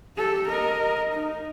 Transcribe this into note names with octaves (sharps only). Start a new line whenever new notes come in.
G4 A4
A#4 D#5
D#4